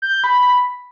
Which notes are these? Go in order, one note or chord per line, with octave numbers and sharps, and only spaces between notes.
G6
G6
B5